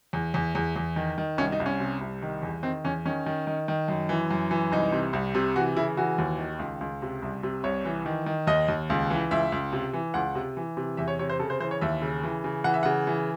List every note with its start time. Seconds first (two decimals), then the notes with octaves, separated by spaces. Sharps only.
0.13 E2
0.34 E2
0.55 E2
0.76 E2
0.96 D#3
1.18 D#3
1.38 C2 C#4
1.52 D#4
1.60 C2
1.66 C#4
1.80 C3
2.01 C2
2.22 D#3
2.42 E2
2.63 D#3 C4
2.85 E2 C#4
3.05 D#3 C#4
3.26 D#3
3.47 D#3
3.68 D#3
3.88 F#2
4.09 E3
4.31 F#2
4.51 E3
4.72 C2 D#4
4.92 C3
5.13 C2
5.35 C3
5.56 E3 F#4
5.76 C#3 E4
5.97 E3 F#4
6.18 D#2
6.39 D#3
6.59 C#2
6.81 C#2
7.02 C3
7.22 C2
7.43 C3
7.64 C2 C#5
7.85 E3
8.06 D#3
8.26 D#3
8.47 D#2 D#5
8.68 D#2
8.90 C#2
9.10 E3
9.31 C#2 E5
9.52 C#2
9.72 C3
9.93 E3
10.14 C#2 F#5
10.35 C3
10.57 E3
10.77 C3
10.97 E2 E5
11.08 C#5
11.19 C3 C#5
11.30 C5
11.39 C#3 A4
11.50 C5
11.60 E3 C5
11.71 C#5
11.81 D#2 E5
12.02 C#3
12.23 E3
12.44 C#3
12.64 E3 F#5
12.74 E5
12.83 C#3 F#5
13.07 E3